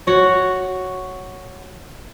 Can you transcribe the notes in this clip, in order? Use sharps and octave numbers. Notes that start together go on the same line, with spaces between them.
F#4 C#5